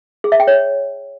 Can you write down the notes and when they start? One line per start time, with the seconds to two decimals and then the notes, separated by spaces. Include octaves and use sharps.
0.24 G#4
0.32 E5
0.40 G5
0.47 C#5